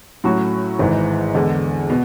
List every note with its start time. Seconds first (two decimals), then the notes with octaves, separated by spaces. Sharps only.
0.24 A2 F#3 C#4 F#4
0.79 G#1 G#2 E3
1.35 E2 D3 G#3
1.90 B2